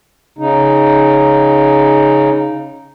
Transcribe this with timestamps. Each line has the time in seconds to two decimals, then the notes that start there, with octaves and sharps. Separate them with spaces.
0.39 C#3 D#4